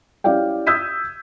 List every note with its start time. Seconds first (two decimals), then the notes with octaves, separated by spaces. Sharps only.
0.24 C#4 E4 G4 D5 F5 G5
0.67 D#6 E6 G6 G#6 B6 D#7